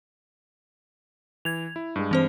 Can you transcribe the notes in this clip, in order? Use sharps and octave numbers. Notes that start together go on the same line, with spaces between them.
E3 G#6 F7
E4
G2 G#3
E3 C4 C5